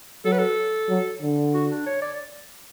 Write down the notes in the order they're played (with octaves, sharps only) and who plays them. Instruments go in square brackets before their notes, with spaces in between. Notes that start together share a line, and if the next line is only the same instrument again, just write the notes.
[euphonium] F#3 [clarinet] A4
[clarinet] B4
A4
[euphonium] F#3
D3
[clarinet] F#4
D4
C#5
D5